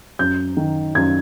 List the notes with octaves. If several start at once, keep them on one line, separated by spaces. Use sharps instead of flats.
F#2 G6
D#3
F#2 G#6